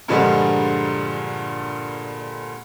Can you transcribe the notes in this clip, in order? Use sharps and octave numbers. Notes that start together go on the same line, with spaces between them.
G2 A#2 D3 F3 G3 G#3